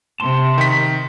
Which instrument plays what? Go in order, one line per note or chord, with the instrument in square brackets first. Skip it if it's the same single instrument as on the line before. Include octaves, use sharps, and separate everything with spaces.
[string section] C3 [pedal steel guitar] A5 C6
[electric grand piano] D#3 B6